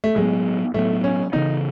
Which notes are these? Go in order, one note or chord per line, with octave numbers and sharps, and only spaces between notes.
A3
A2 F#3 G#3 B3
A2 F#3 A3 B3
C#4
C#3 E3 B3 D#4